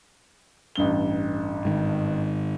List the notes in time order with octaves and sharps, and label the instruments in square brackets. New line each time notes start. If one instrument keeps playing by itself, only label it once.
[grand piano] A1 G2 G7
[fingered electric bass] G#2 D#3